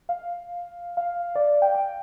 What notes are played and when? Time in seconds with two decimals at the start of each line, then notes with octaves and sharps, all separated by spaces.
0.09 F5
0.97 F5
1.35 D5
1.62 G5
1.75 G5